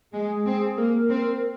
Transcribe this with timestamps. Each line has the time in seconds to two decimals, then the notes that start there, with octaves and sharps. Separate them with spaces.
0.13 G#3 G#4
0.46 C4
0.77 A#3 A#4
1.09 C4